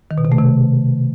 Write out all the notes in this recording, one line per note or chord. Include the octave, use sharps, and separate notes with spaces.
D#3
B2
C3
A3
C3